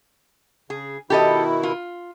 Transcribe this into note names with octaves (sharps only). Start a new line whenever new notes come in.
C#3 G#4
B2 D#3 E4 G4 A4 D#5
F4